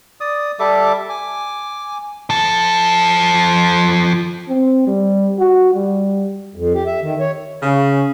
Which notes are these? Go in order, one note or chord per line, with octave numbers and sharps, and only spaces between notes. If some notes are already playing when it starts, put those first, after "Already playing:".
D5 D#6
G3 A4 E5 D6
G#5 D6
F3 A4
C4
G3
F#4
G3
F2
G4
E5
D#3
C#5
C#3